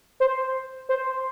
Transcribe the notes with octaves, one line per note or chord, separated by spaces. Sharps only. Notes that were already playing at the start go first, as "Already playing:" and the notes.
C5
C5